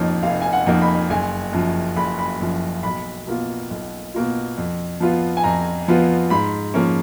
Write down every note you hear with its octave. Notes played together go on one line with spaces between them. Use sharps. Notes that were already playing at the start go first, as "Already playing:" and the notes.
Already playing: F1 F2 F3 A#3 D#4 C#5
F1 F5
G#5
F#5
F2 F3 A#3 D#4
B5
F#1 G#5
F#2 F3
F#1 B5
B5
F#2 F3
B1 B5
B2 A#3 F4
B1
B2 A#3 F4
F2
F3 B3 F4
G#5
F2 A#5
F3 B3 F4
G#2 B5
F3 A#3 C#4